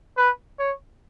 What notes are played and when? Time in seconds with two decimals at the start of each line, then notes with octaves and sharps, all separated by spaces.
0.17 B4
0.59 C#5